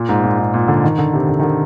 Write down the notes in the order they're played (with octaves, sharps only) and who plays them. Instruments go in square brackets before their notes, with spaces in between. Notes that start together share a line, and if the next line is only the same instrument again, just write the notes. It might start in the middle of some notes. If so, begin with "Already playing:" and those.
Already playing: [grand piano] A#2
G#2
A#2
G#2
A#2
D3
D#3
D3
C3
D3
D#3
D3